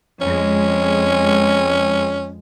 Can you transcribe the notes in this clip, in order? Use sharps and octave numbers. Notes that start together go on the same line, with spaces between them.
F2 G#3 C#4